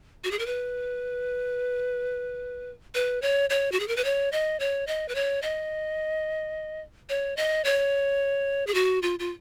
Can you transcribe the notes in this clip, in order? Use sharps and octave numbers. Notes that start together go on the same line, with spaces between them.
F#4
G#4
A#4
B4
B4
C#5
C#5
F#4
G#4
A#4
B4
C#5
D#5
C#5
D#5
B4
C#5
D#5
C#5
D#5
C#5
G#4
F#4
F4
F4